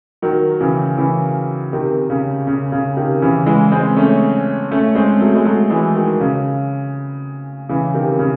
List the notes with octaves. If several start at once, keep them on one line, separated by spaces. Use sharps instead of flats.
D#3 F#3
C#3 E3
C#3 E3
C3 D#3
C#3
C#3
C#3
C3 D#3
C#3 E3
E3 G#3
G#3 C4
A3 C#4
A3 C#4
G#3 C4
F#3 A3
G#3
F#3 A3
E3 G#3
D#3 F#3
C#3
C#3 E3
C3 D#3
C#3